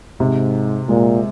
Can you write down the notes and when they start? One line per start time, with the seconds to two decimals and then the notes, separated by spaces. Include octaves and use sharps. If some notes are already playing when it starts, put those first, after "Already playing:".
0.20 G#2 C3
0.89 A#2 G#3